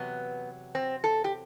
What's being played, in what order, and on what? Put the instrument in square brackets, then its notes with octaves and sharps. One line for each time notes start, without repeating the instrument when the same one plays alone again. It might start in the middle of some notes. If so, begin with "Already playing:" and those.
Already playing: [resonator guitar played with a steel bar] E2 C3 F#3 B3
C4
A4
G4